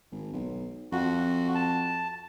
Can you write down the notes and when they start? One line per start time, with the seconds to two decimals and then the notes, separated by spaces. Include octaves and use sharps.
0.12 G#1
0.33 B1
0.92 F2 F#4
1.55 A5